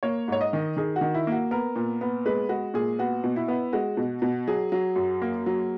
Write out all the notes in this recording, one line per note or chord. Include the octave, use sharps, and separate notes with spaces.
A#3 C#5
G#2 C#5
D#5
D#3
D#3 G#4
F#4
D#3
E4
A#3 F#4
B3 A#4
A#2
B3
G#3 B4
G#3 F#4
A#2 G#4
B3 F#4
B2
E4
B3
G#3 F#4
B2
B2
F#3 G#4
F#3
F#2
A#3
F#3